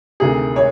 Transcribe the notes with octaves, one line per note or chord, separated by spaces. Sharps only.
D2 C3 D#3 G#4
C#5